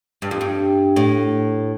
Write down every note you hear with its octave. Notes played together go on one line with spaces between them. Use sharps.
G2
F2
G2
A2